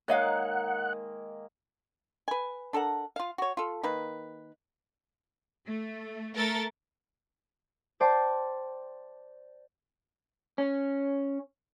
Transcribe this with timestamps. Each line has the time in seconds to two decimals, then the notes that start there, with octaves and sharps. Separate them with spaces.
0.08 D#3 G#3 A#3 C#5 D#5 F5 F#5
2.28 B4 G#5
2.73 D4 A4 A#4 F#5
3.16 F4 F5
3.38 F#4 C#5
3.57 F4 A4
3.83 D#3 A#3 B4
5.65 A3
6.35 A3 A4 A#4 A6
8.00 C5 D5 G5 A5
10.58 C#4